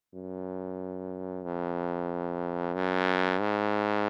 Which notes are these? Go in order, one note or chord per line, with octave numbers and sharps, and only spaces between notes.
F#2
F2
F#2
G#2